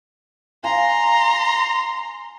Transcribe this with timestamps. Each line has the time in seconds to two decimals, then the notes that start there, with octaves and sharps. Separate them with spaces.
0.64 F5 G#5 A#5 C6